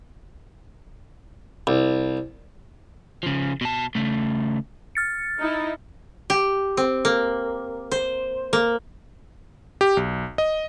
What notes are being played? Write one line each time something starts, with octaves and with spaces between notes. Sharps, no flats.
C2
C#3 F3
B2 A5
C#3 A3
F6 A6 C#7
D#4 E4
G4
C4
A#3
C5
A#3
G4
B1
D#5